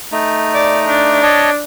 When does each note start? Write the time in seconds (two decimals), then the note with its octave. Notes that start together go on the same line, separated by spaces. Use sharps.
0.12 A3 D#4
0.54 D5
0.88 D4
1.23 C#5 D#5 A5